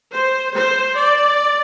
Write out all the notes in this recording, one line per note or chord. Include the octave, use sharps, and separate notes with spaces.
C5
C5
D5